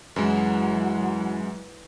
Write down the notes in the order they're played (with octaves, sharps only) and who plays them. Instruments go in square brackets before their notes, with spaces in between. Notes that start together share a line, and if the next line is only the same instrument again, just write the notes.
[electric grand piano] F#2 G#3 [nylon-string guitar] E3 [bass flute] F#3